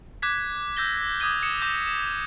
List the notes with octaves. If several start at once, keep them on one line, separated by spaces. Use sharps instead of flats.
D6 F#6 G#6 B6
E6 G6 A#6 G7
D6 D#6 G#6 D#7 G7
D#6 C#7 E7
D6 G6 A#6
E7